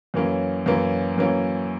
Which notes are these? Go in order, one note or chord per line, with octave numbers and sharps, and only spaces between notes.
F#2 E3 A#3 C#4
F#2 E3 A#3 C#4
F#2 E3 A#3 C#4